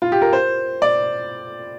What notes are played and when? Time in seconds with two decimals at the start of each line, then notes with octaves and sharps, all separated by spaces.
0.02 F4
0.12 G4
0.22 A#4
0.33 C5
0.82 D5